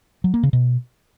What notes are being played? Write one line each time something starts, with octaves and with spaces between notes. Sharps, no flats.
F#3
A#3
C#3
B2